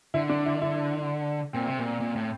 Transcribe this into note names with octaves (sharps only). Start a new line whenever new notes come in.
D3 E4
D4
E4
E4
A#2 C4
C3
A#2
A#2
A2